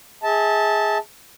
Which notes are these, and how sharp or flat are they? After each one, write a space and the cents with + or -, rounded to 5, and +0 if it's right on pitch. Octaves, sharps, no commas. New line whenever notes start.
G#4 +0 E5 -35 A5 +0